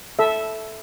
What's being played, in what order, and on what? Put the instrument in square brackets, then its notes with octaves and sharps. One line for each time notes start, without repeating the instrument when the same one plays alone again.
[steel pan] A4 E5